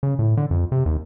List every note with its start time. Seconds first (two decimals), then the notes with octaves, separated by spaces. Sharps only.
0.03 C#3
0.19 A2
0.37 D3
0.51 F2
0.72 C3
0.86 D#2